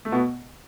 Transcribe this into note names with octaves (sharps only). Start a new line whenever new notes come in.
A3
B2 B3